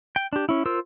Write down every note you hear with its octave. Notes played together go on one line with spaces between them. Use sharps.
G5
D4 G4
C#4 E4
F4 A#4 C5 E6